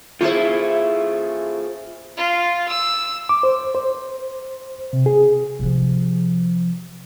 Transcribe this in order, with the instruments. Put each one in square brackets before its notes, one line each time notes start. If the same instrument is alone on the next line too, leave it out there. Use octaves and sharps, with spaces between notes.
[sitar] A3 E4 [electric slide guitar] F4 G#4 C5
[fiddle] F4
E6
[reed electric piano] D6
C5
C5
C3
G#4
[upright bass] C3 F3